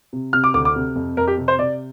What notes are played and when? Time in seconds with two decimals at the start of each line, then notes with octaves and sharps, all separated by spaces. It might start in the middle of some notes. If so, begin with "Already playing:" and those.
0.13 C3
0.33 C3 F6
0.44 D6
0.54 D2 D6
0.65 D6
0.76 C3
0.96 F2
1.17 F2 A#4
1.28 G4
1.38 C3
1.48 C5
1.59 C3 D5